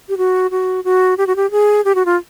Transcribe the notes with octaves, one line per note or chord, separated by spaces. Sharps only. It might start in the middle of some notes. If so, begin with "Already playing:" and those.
G4
F#4
F#4
F#4
G4
F#4
G4
G#4
G4
F#4
F4